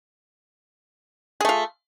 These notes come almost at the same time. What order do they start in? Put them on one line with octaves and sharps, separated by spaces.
G#4 A3 F4